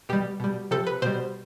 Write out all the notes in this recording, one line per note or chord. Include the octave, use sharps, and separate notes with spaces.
B2 G3 G4
B2 G3
C3 F3 A4
B4
B2 G3 C5